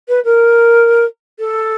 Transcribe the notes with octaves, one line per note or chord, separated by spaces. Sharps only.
B4
A#4
A4